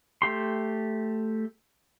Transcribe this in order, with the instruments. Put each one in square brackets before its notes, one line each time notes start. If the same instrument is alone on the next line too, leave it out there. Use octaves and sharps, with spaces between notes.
[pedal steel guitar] A3 G4 C6